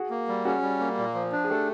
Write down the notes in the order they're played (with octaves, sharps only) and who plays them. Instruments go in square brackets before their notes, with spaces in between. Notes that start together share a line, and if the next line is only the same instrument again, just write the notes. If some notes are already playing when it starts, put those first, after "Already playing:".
Already playing: [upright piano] F#4 G#4
[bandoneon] A#3
G3
[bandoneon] C#4 [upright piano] F#4 G#4
[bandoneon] G3
A#3
A#2
F3
D4
[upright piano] G#4
[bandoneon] A3 [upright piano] G4 A4